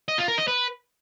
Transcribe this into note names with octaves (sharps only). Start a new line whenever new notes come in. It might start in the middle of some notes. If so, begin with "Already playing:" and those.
D#5
F4
A#4
D#5
B4